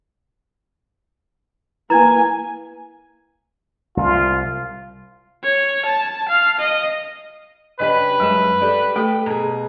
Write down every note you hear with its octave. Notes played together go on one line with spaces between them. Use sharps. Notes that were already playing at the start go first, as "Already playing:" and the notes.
A#3 E4 B4 G#5 A#5 G#6
C2 F4
C#5
A5
F5
D#5
C#3 D4 G4 B4 D#5
F#2 G3 G#3 G#4
G4 A4 D5
A3 G4 A4 G5
B2 G#4 A#5